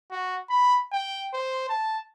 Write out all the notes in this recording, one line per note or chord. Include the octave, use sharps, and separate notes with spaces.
F#4
B5
G5
C5
A5